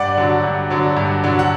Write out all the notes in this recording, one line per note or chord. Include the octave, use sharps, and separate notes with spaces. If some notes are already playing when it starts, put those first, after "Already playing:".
Already playing: G2 D5 F#5
D3 F#3
G2
D3 F#3
G2
D3 F#3
F#5